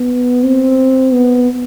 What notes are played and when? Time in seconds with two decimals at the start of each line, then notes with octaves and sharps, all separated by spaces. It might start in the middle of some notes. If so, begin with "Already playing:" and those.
Already playing: B3
0.43 C4
1.13 B3